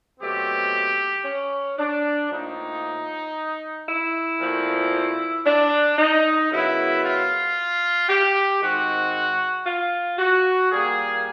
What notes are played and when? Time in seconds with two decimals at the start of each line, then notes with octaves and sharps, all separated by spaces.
0.20 B2 F#3 A3 C4 G4
1.25 C#4
1.78 D4
2.31 A2 F3 A#3 D#4
3.88 E4
4.40 A#2 F3 A3 C4
5.46 D4
5.98 D#4
6.51 F#2 C#3 F#3 B3 E4
7.04 F4
8.09 G4
8.61 G#2 D#3 G#3 C4 F#4
9.66 F4
10.19 F#4
10.71 A#2 G3 A#3 G#4